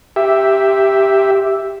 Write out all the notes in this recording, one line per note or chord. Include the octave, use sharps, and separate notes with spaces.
G4 E5